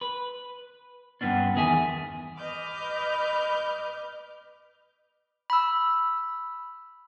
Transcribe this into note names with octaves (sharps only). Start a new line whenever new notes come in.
B4
G2 D3 B3 C#4 D4
E2 D#3 G#4 E5 G#5
B4 D#5 D6 F6 G6
B5 E6